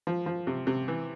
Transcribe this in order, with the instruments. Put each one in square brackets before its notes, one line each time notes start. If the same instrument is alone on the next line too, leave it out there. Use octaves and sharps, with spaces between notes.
[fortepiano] F3
F3
C3
C3
E3